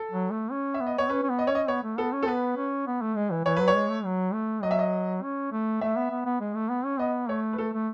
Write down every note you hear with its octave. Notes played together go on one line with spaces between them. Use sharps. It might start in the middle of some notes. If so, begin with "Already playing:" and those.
Already playing: A4
F#3
A3
C#4
E5
B3
D#5
B3 C#5
C#4 B4
C#4
B3
D#5
C#4 C#5
D#5
B3 C#5
A3
B3 A4
C#4
A4
B3 B4
C#4
B3
A3
G#3
E3
E3 C#5
F#3 B4
C#5
G#3
A3
F#3
A3
F#3 D#5
E5
D#5
C#4
A3
A3 E5
B3
B3
B3
G#3
A3
B3
C#4
B3 D#5
A3 C#5
B4
A3 A4
A3